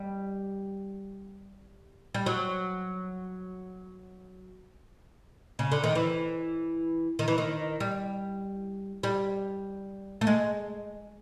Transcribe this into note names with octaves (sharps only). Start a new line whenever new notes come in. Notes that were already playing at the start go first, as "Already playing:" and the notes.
Already playing: G3
G3
F#3
C#3
D3
D#3
E3
D#3
E3
D#3
G3
G3
A3
G#3